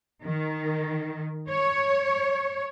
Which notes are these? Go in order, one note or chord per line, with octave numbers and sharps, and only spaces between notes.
D#3
C#5